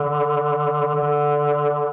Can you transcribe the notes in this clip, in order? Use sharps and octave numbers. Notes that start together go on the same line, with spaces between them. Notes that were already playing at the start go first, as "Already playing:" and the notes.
Already playing: D3
D3